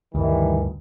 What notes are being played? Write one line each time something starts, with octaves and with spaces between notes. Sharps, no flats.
D2 G2 D#3 E3 G3